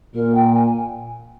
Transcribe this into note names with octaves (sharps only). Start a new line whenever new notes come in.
A#2 A#4
G5
G#5